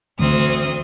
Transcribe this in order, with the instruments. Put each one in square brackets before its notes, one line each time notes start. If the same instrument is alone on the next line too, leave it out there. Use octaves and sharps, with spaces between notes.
[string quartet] D2 C4 D#6 [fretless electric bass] D3 E3 A3